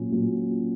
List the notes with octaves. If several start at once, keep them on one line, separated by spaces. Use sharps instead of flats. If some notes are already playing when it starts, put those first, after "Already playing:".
Already playing: A#2 F#3 C#4 F4
A#2 F#3 C#4 F4